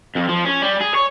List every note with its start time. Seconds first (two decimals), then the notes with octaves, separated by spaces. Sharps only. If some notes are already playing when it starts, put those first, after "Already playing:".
0.16 F2
0.29 F3
0.45 C#4
0.62 G3
0.81 G#4
0.95 C#5